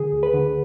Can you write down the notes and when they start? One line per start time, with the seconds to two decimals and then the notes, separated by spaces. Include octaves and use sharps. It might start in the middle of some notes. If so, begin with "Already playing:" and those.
Already playing: D3 G#4
0.12 D2
0.23 B4
0.34 D3